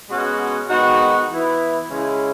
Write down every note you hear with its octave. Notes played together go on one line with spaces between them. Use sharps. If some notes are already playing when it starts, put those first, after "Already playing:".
B2 G#3 C#4 F#4
D#3 G#3 B3 D#4 F#4
E3 B3 E4
C#3 G#3 C#4 E4